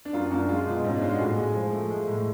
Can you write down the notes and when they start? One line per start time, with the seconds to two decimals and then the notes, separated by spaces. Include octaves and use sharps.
0.05 D4
0.13 F#2 F4
0.31 F#2 D4
0.49 G#3 F4
0.66 B2
0.84 G#2 C#4
0.96 D4
1.02 G#3 F4
1.11 F#4
1.19 A2 G#4
1.37 G#3
1.55 F3
1.72 A3
1.90 G#3
2.08 A2